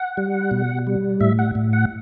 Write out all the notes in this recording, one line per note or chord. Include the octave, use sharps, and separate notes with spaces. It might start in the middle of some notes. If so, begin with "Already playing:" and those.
Already playing: F#5
G3
B2
G3
A2 E5
F#5
A2
F#5